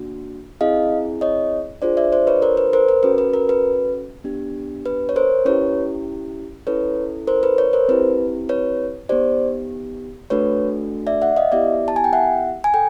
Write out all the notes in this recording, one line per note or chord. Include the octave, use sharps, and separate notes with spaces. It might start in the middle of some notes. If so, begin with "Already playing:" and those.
Already playing: A#3 D4 F#4
C4 E4 G#4 D#5 F5
C#5 D#5
D4 F4 G#4 C5 D5
D5 E5
C5 D5
B4 C#5
A#4 C5
B4
A#4 C5
A#4
C#4 F#4 A4 B4
B4
A#4
B4
B3 D4 G4
B4
C#5
A#4 C5
C#4 E4 G4 B4 C#5
C#4 E4 A4 B4 C#5
A#4 C5
B4
B4 C#5
A#4 C5
C4 E4 G4 B4
B4 C#5
B3 D#4 G4 C5 D5
A3 D4 F#4 A4 B4 C#5
D5 E5
E5 F#5
D#5 F5
B3 E4 G4 D5 E5
A5
G#5
G5
E5 F#5
G#5
A4 G5